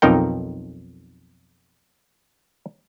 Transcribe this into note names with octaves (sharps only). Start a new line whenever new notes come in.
B1 F2 D#4 A#4 G5